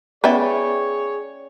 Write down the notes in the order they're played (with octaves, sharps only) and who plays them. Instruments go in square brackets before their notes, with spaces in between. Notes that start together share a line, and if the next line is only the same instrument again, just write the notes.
[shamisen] B3 E4 [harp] C#4 D5 G5 [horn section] G#4 C#5